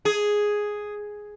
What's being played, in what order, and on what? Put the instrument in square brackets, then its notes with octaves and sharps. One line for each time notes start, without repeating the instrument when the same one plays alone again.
[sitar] G#4